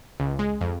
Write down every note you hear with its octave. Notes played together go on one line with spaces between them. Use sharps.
C#2
G#3
F2